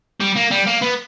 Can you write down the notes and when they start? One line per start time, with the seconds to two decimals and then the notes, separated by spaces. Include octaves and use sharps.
0.20 G3
0.35 A#3
0.51 G3
0.67 A#3
0.82 B3